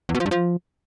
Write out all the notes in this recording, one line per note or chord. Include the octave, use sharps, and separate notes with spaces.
E2
B2
F3
G2
F3